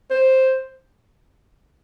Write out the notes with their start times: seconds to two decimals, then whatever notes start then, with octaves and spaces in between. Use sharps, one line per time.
0.11 C5